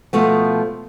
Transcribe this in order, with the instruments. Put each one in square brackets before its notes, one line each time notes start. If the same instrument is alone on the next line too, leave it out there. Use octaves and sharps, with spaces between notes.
[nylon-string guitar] B2 F3 A3 B3